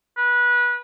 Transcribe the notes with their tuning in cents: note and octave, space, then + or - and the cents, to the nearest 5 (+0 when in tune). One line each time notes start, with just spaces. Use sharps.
B4 -20